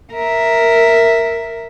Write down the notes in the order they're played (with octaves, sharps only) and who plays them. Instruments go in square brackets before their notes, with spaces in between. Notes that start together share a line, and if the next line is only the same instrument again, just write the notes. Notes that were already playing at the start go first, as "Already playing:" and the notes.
[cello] A#4 E5